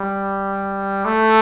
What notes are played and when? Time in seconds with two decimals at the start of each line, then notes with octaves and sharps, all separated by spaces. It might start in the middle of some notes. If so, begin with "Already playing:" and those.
Already playing: G3
1.05 A3